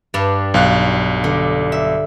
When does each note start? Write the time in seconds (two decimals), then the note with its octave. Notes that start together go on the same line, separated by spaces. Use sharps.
0.14 G2 G3 D4
0.54 B1 F5 F#6
1.24 D3
1.72 E5